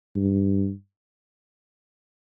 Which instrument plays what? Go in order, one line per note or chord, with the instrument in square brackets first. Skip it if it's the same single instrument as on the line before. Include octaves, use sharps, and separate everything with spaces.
[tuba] G2